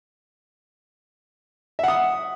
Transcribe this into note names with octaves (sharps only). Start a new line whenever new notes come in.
E5 F#5 D#6